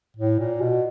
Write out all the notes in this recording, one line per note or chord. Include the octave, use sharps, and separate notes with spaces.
A2
A#2
B2